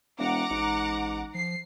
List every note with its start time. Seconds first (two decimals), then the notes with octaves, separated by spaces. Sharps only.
0.19 E1 F#5 A#5 D6
0.51 A1 G#2
1.35 F3 C7